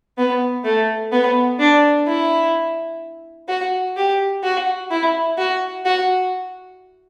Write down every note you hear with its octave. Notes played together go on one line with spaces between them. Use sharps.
B3
A3
B3
D4
E4
F#4
G4
F#4
E4
F#4
F#4